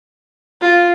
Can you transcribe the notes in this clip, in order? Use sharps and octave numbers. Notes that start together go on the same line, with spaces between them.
F4